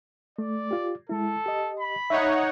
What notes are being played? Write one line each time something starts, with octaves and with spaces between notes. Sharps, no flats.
A3 D5
F4 G4
G#3 E4 A4
G4 D#5
B5
D#4 C#5 D#5 E5 F#5